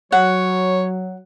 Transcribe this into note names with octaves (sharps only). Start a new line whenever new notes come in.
F#3 C#5 F#5